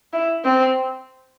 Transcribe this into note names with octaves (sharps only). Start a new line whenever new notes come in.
E4
C4